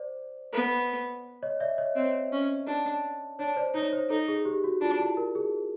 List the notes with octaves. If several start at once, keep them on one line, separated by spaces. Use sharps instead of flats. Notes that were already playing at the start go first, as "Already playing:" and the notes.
Already playing: C5 D5
B3
C#5 D#5
D5 E5
C#5 D#5
C4 C#5 D#5
C#4
D4
D4 C#5
C5 D5
D#4 C#5
C5
D#4 A4
G#4
G4
F#4
D4 F4
E4
A#4
G#4